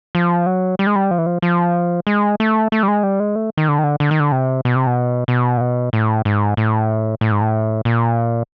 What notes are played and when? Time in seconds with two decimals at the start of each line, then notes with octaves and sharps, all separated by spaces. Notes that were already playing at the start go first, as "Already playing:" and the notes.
0.15 F3
0.46 F#3
0.79 G3
0.87 G#3
0.96 G3
1.11 F3
1.18 E3
1.26 F3
1.42 F3
2.07 G#3
2.40 A3
2.72 A3
2.83 G3
2.88 G#3
3.03 G3
3.20 G#3
3.36 A3
3.57 D#3
3.68 D3
3.79 D#3
3.83 D3
4.00 D3
4.11 D#3
4.20 D3
4.32 C3
4.65 B2
4.75 C3
4.87 B2
5.28 B2
5.57 A#2
5.61 B2
5.93 A2
6.25 G#2
6.57 A2
7.21 A2
7.32 G#2
7.41 A2
7.85 A#2